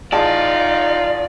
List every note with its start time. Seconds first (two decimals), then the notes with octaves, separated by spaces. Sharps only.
0.12 A1 D#4 F4 G#4 D5 A5